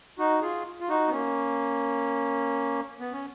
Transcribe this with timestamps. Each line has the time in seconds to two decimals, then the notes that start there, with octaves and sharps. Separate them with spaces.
0.18 D#4 F#4
0.42 F4 G#4
0.80 F4
0.89 D#4 F#4
1.08 B3
1.12 A#3 C#4
2.99 B3
3.13 C#4